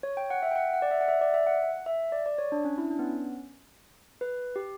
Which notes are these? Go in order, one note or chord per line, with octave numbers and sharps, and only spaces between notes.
C#5
G5
F#5
E5
G5
F#5
F#5
D5
E5
F#5
E5
D5
E5
F#5
E5
D5
D5
C#5
D4
C#4
E4
D4
B3
C#4
B4
G4